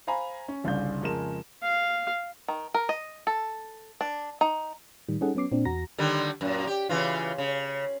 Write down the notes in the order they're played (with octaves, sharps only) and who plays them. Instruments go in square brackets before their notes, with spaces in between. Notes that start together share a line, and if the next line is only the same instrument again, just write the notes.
[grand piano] C5 F5 G#5 A#5 B5
C#4
G1 C2 C#3 D4 F5 G6
F2 C#3 G#3 A#4 A5 E7
[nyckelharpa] F5
[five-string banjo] D#3
A#4
D#5
A4
D4
D#4
[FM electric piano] A2 D#3 G3
G3 C#4 D#4 G#4 A4 F#5
F#3 B3 C#4 D6 C7
A#2 C4 D4
E2 F#4 A#5 A#6
[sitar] D3 D#3 G3
F#2 A#2
G4
C#3 E3 F4
C#3